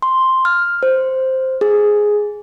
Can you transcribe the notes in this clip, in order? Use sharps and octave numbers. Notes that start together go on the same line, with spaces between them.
C6
F6
C5
G#4